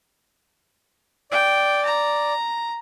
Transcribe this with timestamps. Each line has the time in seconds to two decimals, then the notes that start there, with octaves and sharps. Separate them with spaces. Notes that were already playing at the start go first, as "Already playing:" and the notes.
1.31 D5 G5
1.85 A#5